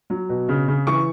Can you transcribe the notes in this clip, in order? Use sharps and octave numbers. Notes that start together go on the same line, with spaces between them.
F#3
B2
C#3
C#3
E3 C#6